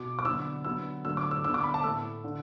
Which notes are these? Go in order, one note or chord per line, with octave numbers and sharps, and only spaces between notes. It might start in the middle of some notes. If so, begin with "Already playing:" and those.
Already playing: B2 B3 D6
D6
D3 F#3 B3 E6
D3 F#3 B3 E6
D3 F#3 A3 E6
D6
E6
D3 B3 E6
D6
B5
A5
A2 A3 E6
D3